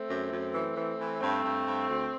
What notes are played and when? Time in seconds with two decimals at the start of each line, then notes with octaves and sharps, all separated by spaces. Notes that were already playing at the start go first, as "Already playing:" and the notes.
Already playing: A3 C4
0.09 F#2
0.32 F#2
0.54 E3
0.77 E3
0.99 E3
1.21 G2 A3 C4
1.44 G2
1.67 G2
1.89 D2